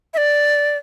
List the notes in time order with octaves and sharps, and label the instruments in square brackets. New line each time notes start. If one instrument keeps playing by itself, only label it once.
[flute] E5
D5